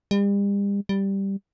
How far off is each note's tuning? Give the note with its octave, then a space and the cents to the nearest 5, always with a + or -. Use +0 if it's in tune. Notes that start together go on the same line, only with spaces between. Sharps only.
G3 +40
G3 +0